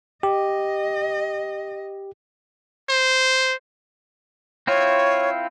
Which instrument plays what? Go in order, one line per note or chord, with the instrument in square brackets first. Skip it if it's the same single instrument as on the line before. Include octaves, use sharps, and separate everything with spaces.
[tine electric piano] G4 [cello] D#5
[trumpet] C5
[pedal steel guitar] C4 E4 F4 [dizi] C#5